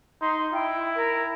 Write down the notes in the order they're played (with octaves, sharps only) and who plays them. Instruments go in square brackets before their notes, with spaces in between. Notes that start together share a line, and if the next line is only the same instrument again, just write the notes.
[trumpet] D#4 [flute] C6
[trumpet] E4 [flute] G5
[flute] A#4